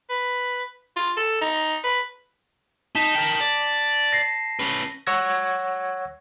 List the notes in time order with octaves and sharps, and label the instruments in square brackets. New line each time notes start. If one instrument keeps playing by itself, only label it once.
[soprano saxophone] B4
F4
A4
D#4
B4
[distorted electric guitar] D#4 [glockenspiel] A5 B6 E7
[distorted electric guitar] A#4 G5
D5
[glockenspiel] A#6 C7
[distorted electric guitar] C#4 B4
[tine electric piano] C#5 F#5 E6 G#6 A#6